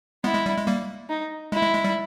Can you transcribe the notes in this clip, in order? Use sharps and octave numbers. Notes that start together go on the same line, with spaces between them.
G#3 B3 E4
G#3
G3
G#3
G3 A#3
D#4
G#3 E4
G#3
G#3
G3